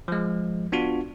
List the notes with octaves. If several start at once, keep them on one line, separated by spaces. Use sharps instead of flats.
F3 G#3
B3 D4 F4 F#4